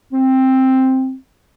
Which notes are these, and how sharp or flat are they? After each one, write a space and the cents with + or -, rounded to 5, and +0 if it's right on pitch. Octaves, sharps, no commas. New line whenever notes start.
C4 +5